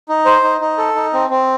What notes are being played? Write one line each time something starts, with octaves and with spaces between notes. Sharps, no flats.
D#4
C5
D#4
D#4
A4
D#4
C4
C4